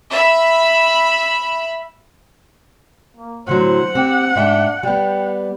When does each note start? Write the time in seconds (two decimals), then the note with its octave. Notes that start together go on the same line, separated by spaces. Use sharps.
0.10 E5 B5
3.17 A#3
3.47 A2 D3 F#3 C5 F#5
3.95 C4 G4
4.36 G#2 D4 E5 G5
4.83 G3 B3 G5